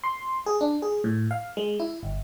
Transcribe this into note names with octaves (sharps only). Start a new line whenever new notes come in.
C6
G#4
D4
G#4
A2
F5
G#3
E4
G1